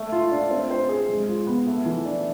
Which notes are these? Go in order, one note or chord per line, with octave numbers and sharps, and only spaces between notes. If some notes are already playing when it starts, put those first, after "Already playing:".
Already playing: A3
F4
D4
C4
C5
G#4
G#3
F4
B3
A3
E3
D4